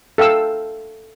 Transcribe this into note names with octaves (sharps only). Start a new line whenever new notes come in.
A4 F5 G5 E6